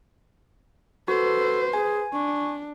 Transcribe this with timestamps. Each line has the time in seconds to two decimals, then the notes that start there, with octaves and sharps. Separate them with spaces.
1.08 F#4 A4 B4 C5
1.73 G#4 G#5
2.13 D4 C#6